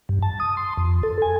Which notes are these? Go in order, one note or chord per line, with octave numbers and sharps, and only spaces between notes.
G2
A5
D#6
C6
F2
A4
G#5